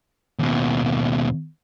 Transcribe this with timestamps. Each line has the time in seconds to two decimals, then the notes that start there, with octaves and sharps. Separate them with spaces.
0.39 D#2 B2